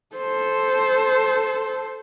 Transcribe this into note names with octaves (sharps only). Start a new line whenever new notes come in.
A4 C5